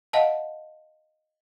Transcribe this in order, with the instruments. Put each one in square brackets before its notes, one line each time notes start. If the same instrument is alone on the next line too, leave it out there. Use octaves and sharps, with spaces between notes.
[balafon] D#5 F5 F#5 A5